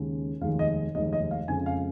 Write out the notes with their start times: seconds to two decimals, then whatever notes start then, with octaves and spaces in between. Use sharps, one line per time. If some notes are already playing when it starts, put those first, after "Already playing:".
Already playing: D#2 C#3 G#3
0.41 F1 D#2 D#3 G#3 F5
0.59 D#5
0.95 F1 D#2 D#3 G#3 D#5
1.13 D#5
1.31 F5
1.48 F2 C#3 G#3 G#5
1.66 F5